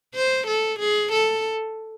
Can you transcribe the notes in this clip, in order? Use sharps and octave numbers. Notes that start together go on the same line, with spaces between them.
C5
A4
G#4
A4